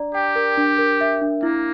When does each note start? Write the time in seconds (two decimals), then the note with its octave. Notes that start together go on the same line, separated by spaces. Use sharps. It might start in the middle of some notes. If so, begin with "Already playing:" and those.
Already playing: D4 D5 A#5
0.14 G4 G5
0.36 A#4
0.57 D4
0.79 A#4
1.01 E5
1.21 D4
1.43 A#3 E4